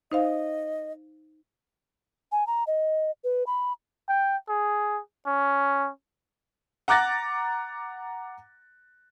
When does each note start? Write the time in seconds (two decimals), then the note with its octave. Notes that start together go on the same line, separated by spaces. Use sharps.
0.11 D#4 C5 D#5 F5
2.32 G#5
2.47 A#5
2.67 D#5
3.24 B4
3.47 B5
4.09 G5
4.49 G#4
5.26 C#4
6.88 F#5 A#5 D6 F#6 A6 A#6